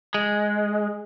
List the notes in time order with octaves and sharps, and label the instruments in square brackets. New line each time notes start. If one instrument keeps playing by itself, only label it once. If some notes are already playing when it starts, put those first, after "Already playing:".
[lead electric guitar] G#3